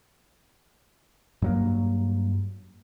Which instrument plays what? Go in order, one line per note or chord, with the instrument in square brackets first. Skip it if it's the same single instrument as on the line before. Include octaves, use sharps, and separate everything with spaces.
[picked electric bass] G2 F#3 A#3